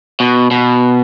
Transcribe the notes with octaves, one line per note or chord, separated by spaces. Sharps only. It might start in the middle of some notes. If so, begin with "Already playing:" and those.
B2
B2